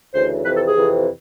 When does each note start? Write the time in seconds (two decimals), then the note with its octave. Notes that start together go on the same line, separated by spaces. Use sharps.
0.12 D2 C#3 E3 C5
0.43 F2 C3 E3 B4
0.54 A4
0.64 G#4
0.75 F2 C3 E3